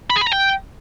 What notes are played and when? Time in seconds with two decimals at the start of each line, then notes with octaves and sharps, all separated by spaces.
0.10 B5
0.16 G#4
0.21 B5
0.27 A#5
0.32 G5